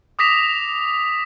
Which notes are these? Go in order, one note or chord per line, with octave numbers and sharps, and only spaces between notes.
D6 D#6 A#6 B6 E7 F7